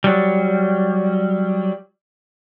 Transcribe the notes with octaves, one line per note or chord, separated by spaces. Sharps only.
F#3 G3